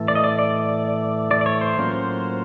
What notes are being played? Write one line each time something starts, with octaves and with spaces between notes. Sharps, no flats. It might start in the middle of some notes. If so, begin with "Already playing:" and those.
Already playing: A2 E3 A3
D5
D#5
D5
D5
D5
D5
C#5
C5
A2 F#3 A#3 C#4 F4